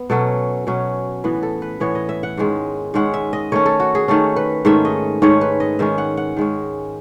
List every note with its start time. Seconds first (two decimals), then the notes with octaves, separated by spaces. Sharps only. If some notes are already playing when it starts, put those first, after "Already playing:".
Already playing: B3
0.10 B2 F#3 C#4 A4
0.67 B2 F#3 C#4
1.24 A2 E3 B3 B4
1.43 A4
1.62 B4
1.80 A2 E3 B3 C#5
1.95 D#5
2.09 E5
2.23 F#5
2.37 G#2 D#3 G#3 C#4
2.94 G#2 D#3 G#3 C#4 F#5
3.14 E5
3.33 D#5
3.52 D#3 A3 C#4 C#5
3.66 A4
3.80 F#4
3.95 G#4
4.08 D#3 A3 C#4 A4
4.36 B4
4.65 G#2 D#3 A3 C#4 E5
4.85 D#5
5.22 G#2 D#3 A3 C#4 C#5
5.41 B4
5.60 D#5
5.79 D#3 G#3 C#4 E5
5.98 F#5
6.17 F#5
6.36 D#3 G#3 C#4